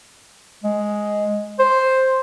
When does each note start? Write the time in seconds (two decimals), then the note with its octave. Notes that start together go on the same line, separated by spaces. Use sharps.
0.64 G#3
1.59 C5